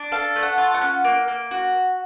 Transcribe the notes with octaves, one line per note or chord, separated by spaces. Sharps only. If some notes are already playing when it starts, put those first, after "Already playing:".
Already playing: D4
A4 F5
A3
F#5
F4
F#5
C#4
A#3
A#3
F#4